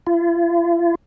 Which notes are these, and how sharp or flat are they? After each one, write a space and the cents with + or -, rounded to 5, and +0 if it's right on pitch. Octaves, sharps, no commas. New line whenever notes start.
F4 -45